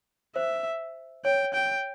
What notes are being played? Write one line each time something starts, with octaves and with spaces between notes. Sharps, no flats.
C5 E5
C#5 G5
G5